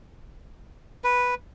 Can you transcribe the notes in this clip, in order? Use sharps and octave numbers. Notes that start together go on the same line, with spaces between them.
B4